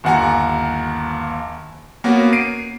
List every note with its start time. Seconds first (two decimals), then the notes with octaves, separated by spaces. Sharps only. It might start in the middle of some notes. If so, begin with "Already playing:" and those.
0.04 G1 D#2 F#5 G#5 A#5
2.04 A#3 B3 C#4 F#4
2.33 C7 D7 D#7